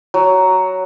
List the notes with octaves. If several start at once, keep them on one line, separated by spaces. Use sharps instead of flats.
F#3